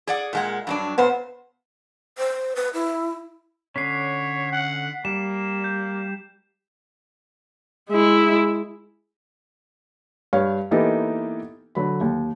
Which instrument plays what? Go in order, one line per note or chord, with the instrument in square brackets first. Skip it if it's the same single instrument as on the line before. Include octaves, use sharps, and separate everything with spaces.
[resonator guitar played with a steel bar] G#4 D5 F#5
A#2 G#3 F#5
G2 F#3 D4
[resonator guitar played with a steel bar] A#2 C5 [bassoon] B3
[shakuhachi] C5
B4
E4
[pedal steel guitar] D3 C#4 [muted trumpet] C#5 [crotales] B6 C7
[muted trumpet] F#5
[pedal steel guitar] G3 [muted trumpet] A#3 [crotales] E7
[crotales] G6
[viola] G#3 E4
[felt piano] G2 C#5 F5
E3 A#3 B3 D#4 G4 A4
D3 F#3 B5
D#2